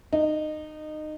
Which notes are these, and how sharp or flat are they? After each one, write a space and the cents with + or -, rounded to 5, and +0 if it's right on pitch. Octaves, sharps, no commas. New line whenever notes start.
D#4 -20